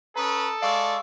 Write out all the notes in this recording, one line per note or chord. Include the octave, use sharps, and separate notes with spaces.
C#4 A4 B4 A#5 D#6
G#3 D5 F5 C#6 E6